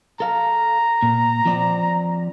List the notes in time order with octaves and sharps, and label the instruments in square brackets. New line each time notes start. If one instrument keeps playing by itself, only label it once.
[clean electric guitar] A4 F5 [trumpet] A#5
[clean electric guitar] A#2
F3 C4 D5